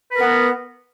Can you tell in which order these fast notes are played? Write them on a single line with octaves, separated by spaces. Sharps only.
B4 A#4 B3